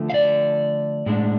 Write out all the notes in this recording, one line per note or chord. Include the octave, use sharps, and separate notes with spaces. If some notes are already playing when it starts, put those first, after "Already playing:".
Already playing: D3 F3 A3
F5
D5
A2 G#3 D4